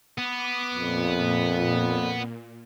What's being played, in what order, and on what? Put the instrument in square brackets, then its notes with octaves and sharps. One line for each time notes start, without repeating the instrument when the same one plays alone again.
[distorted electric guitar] B3 [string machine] D6
[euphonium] F2 [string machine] A#2